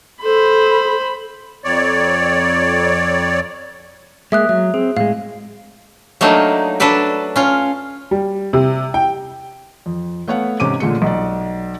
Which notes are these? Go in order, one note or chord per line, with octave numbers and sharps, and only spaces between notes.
A4 C5 B5
F2 C#5 D5
G#3 A#3 E5 D#6 F#6
F#3 E5
C4 G#4
A2 G#3 F5
F#3 A3 A#3 D4 D#4
D4 F#4 A4 B4 D5
C#4 F4
G3
C3
G5
F2
A3 B3 C#5 F5 F#5
G#2 C3 C#4 D6 D#7
A#2 D3 G#3 A3 C#7
B1 D5